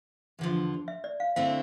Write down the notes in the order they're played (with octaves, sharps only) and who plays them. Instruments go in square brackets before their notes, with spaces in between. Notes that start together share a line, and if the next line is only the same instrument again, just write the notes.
[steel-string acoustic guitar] E2 D3 F3
[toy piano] E5
D5
F5
[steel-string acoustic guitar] D3 A3 C4 E4 [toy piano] F5